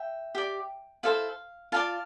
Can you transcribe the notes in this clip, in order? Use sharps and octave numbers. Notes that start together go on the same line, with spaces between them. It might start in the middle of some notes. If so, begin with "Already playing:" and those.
Already playing: E5 G5
G4 D5
E4 A4 C5 F5
F4 B4 D5 F5 A5